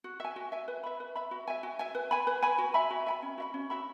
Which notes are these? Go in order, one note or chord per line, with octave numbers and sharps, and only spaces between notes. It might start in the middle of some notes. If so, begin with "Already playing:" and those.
F#4
E5 G#5
F#4
E5 G#5
B4
E5 B5
B4
E5 B5
F#4
E5 G#5
F#4
E5 G#5
B4
G#5 B5
B4
G#5 B5
F#4
E5 G#5 B5
F#4
E5 G#5 B5
C#4
F#4 E5 B5
C#4
F#4 E5 B5